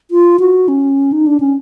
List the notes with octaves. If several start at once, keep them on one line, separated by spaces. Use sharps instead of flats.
F4
F#4
C#4
D#4
D4
C#4